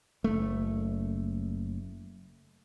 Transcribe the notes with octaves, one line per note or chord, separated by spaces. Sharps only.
F#1 A3